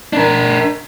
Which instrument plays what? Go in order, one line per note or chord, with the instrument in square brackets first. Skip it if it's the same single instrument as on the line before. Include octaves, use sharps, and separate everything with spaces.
[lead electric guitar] D4 A#4